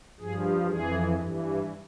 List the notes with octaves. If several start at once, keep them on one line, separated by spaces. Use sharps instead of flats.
G2 F3 G#4
F2 E3 G#4
G2 E3